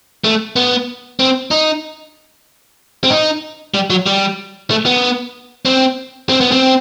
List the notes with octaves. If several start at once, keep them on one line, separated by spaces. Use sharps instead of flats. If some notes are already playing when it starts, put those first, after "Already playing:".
A3
B3
C4
D#4
C4
D#4
G3
F#3
G3
A3
B3
C4
C4
B3
C4